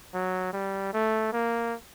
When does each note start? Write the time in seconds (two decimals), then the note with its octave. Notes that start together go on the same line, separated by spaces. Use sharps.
0.14 F#3
0.53 G3
0.94 A3
1.32 A#3